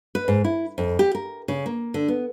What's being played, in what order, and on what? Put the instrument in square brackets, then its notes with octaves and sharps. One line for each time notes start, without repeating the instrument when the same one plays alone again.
[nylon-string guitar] B4
G#2
E4
F2
G4
A#4
C#3
A#3
D3
B3